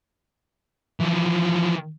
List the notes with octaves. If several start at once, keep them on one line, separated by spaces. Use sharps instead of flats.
E3 F3